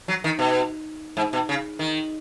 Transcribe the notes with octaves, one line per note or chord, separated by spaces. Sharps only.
F#3
D#3
B2
G#2
B2
C#3
D#3